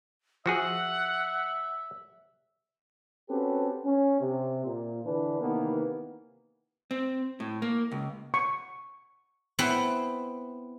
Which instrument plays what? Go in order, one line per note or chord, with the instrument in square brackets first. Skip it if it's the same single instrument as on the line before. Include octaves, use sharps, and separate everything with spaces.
[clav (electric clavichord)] F3 F#4 G#4 [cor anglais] E5 [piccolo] F#5
[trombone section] C4 C#4 F#4 G4 A4 B4
C#4
C3
A#2
D3 E3 D4 B4
C3 D#3 E3 A#3 B3
[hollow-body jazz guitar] C4
A2
A#3
C#2
[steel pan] C#6
[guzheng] B3 C4 E4 B4 G5